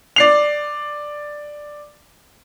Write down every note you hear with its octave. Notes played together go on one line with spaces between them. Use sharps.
D5 C7 F7